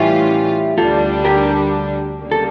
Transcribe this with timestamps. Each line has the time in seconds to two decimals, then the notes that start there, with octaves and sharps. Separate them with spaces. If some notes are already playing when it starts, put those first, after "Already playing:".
Already playing: A2 E3 G3 C#4 E4 F4 G4
0.78 D2 D3 G3 D4 F4 A4
1.25 G4 A#4
2.19 C#3 G3 A#3
2.32 A4